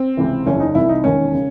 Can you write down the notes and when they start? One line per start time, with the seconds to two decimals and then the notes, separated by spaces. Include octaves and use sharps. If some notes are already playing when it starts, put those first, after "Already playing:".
Already playing: C4
0.17 C#2 C3 E3
0.46 F#1 E2 C#3 E3 C#4
0.60 D#4
0.75 C2 C3 E3 E4
0.89 D#4
1.04 E1 D#2 D#3 C#4
1.34 C#3